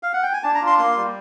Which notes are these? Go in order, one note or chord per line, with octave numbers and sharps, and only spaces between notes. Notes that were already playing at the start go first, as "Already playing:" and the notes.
F5
F#5
G5
G#5
D4 A5
A#5
F4
C6
A#3 C6
G3